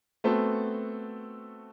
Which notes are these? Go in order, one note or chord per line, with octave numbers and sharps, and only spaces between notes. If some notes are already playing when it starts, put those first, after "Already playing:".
A3 B3 C4 F#4 A4